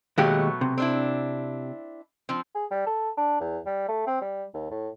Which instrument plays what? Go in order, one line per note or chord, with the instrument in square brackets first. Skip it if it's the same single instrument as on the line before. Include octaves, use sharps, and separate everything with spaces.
[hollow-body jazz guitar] D#2 G#3 G4 [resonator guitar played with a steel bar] B2 F#3 A3
[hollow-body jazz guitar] C3
[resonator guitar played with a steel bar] C4 D4 E4
F3 C4
[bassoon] G#4
G3
A4
D4
E2
G3
A3
C4
G3
D#2
A2